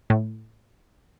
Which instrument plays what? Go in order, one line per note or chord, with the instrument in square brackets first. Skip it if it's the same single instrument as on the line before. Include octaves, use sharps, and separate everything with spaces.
[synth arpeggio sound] A2